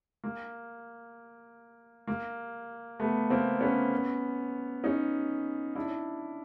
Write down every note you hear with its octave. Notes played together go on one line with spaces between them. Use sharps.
A#3
A#3
A3 B3
A#3 C4
B3 C#4
C#4 D#4
D4 E4